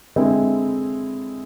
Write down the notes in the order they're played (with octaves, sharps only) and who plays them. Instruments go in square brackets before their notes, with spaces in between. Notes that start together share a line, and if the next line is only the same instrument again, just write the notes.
[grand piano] D3 G#3 C4 E4